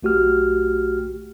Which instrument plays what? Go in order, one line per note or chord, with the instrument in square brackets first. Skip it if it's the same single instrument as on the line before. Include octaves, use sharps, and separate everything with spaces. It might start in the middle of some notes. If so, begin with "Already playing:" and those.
[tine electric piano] B1 A3 F#4 G4 F6